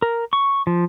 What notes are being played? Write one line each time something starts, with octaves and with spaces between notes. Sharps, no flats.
A#4
C#6
F3